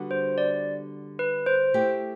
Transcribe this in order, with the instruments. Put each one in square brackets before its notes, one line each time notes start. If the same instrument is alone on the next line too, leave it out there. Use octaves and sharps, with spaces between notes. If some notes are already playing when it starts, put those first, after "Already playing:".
Already playing: [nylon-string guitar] D3 G3 B3 F#4
[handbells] C5
D5
B4
C5
[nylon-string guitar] A3 E4 G4